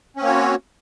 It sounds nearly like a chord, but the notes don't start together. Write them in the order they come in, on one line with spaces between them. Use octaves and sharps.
C#4 C4 A#3 C#5 F#4